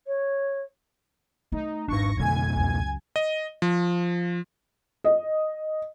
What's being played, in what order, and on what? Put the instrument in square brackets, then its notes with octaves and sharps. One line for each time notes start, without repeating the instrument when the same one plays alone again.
[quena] C#5
[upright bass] A3 [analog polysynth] D#4
[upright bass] G#1 D#4 [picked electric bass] G#2 D4 [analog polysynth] C#6 A#6
[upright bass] A1 D3 [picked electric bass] F2 B2 A3 [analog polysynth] G#5 G#6
[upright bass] C#2 F#2
[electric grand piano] D#5
F3
[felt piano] D#5